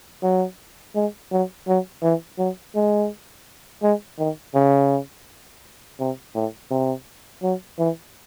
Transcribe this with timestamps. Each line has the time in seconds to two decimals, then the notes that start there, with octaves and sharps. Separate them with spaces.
0.23 F#3
0.95 G#3
1.32 F#3
1.68 F#3
2.03 E3
2.38 F#3
2.75 G#3
3.83 G#3
4.19 D#3
4.55 C#3
6.00 C3
6.35 A2
6.71 C3
7.43 F#3
7.79 E3